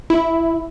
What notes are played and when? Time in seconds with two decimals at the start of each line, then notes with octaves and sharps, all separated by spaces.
0.10 E4